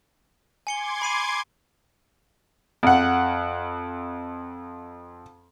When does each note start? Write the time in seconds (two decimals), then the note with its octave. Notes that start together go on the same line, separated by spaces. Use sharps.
0.67 G#5 C6 D6 G#6 C#7 G7
1.02 B5 C7 D#7
2.83 F2 F#5